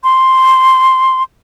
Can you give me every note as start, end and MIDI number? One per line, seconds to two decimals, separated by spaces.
0.04 1.23 84